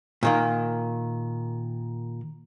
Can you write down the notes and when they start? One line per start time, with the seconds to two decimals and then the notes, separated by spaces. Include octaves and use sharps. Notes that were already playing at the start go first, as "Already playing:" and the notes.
0.23 A#2 D#3 A#3